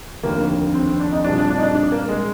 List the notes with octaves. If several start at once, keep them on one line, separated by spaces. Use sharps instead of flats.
F1 D#2 D3 A#3
C4
C4
D4
D#4
A#2 G3 C4 D4 F4 G#4
D4
D4
D#4
D4
D4
A#3
G#3